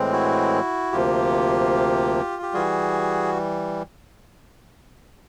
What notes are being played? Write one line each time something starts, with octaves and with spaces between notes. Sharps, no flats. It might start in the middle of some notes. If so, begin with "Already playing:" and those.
Already playing: A2 E3 G#3 C4
E4 F#4
D2 C3 F3 A#3 F4 G4
G4
E3 G3 F#4 G#4